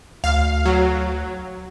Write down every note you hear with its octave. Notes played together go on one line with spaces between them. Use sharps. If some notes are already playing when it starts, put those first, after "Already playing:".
D2 F5
F#3